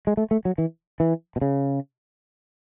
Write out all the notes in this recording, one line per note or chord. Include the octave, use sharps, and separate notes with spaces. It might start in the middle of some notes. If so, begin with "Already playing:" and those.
G#3
A3
A3
F#3
E3
E3
B2
C#3